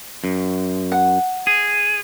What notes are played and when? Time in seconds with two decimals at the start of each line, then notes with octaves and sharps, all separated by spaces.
0.24 F#2
0.92 F#5
1.47 G#4